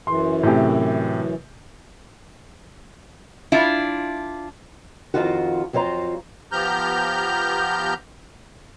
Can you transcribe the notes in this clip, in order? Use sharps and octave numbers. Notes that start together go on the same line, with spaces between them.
F#2 E3 C6
A2 C3 G4
D4 E4 F4
F2 B2 D#3 F3 F4 F#4
F2 F#3 F4 C5 A#5
F3 B3 G4 A#5 F6 G6